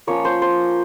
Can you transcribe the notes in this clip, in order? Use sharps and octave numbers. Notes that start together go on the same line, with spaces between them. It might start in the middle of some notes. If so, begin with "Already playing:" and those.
F3 A#3 C#4 C#5
C5
C5